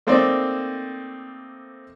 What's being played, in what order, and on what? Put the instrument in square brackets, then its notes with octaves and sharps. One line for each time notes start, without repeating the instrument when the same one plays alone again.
[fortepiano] A3 A#3 C4 D#4 C5 D5